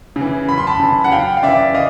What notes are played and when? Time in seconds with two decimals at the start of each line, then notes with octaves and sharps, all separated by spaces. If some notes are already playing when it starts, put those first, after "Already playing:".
0.16 C#3
0.21 E3
0.48 F#2 B5
0.58 C6
0.67 A5 B5
0.80 C#3 E3
1.04 F#5
1.12 F#2 F5 G5
1.37 F5
1.43 C#3 E3 D5 E5
1.75 D#5 F5